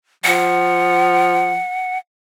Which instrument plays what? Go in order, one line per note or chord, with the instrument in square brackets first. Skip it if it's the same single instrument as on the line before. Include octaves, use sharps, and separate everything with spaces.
[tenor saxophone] F3 [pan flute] F#5